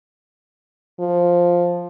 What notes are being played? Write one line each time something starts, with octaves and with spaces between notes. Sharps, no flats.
F3